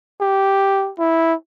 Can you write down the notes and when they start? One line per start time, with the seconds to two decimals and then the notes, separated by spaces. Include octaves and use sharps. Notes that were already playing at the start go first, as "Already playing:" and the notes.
0.21 G4
0.99 E4